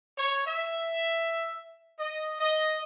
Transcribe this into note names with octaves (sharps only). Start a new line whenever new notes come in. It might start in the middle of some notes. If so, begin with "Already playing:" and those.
C#5
E5
D#5
D#5